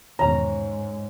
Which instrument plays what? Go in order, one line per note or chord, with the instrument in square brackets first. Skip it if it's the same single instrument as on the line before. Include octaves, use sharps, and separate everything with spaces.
[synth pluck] E2 B2 D#3 [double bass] G#2 G#3 [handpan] C#5 [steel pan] A#5